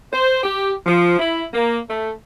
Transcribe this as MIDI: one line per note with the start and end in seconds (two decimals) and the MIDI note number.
0.13 0.42 72
0.43 0.72 67
0.86 1.19 53
1.19 1.45 64
1.52 1.79 58
1.90 2.10 57